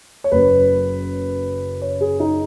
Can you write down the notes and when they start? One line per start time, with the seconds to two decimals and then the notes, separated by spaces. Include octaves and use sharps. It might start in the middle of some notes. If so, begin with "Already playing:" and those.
0.24 C#5
0.31 F#1 F#2 F#3 B4
1.81 C#5
2.01 G#4
2.20 D#4